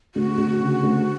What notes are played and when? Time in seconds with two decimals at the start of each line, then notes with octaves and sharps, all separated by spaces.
0.15 D2 F#4
0.38 D2
0.60 C#3
0.82 D2